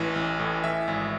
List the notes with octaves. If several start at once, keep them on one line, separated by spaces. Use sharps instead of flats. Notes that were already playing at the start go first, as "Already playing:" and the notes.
Already playing: A1 E3
A1
A2
E3 E5
G#1